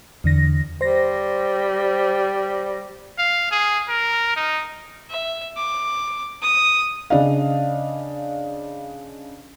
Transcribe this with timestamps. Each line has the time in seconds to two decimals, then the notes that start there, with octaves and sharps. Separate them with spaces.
0.24 E2 D3 A#6
0.81 G3 C5 A#6
3.19 F5
3.51 G#4
3.89 A#4
4.36 D#4
5.10 E5
5.56 D6
6.42 D#6
7.10 C#3 D4 D#5 F5